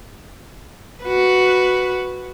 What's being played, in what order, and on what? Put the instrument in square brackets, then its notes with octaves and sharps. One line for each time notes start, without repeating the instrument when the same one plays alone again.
[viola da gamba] F#4 B4